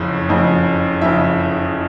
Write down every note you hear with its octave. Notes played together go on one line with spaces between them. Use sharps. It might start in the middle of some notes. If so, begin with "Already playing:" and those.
Already playing: F#1 F2 C#3
F#1 F2 C#3
F#1 F2 C#3 E5